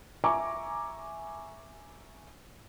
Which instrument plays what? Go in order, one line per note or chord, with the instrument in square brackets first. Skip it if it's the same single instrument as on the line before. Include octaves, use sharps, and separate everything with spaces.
[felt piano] E5 G#5 A#5 C#6 D6